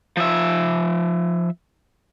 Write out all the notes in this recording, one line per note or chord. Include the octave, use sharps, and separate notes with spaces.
F3 E5